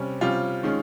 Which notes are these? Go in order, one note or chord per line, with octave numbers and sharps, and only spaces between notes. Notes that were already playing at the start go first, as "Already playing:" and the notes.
Already playing: C3 G3 C#4
C3 G3 C#4 F4
D#3 G#3 C#4